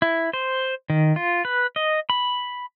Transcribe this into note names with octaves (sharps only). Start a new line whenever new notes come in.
E4
C5
D#3
F4
B4
D#5
B5